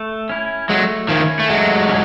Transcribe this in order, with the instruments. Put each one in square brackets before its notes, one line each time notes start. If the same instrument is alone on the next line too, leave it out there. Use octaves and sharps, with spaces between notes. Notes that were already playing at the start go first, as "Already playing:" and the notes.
Already playing: [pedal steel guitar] A3
C#4 E4
[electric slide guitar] F#3 G#3 [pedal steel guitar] A3
[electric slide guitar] D#3 F3 [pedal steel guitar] C#4 E4
[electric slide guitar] A3
[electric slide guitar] F#3 G#3 [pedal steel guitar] A3
[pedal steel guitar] C#4